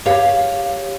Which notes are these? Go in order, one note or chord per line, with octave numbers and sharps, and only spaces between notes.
G4 C#5 F5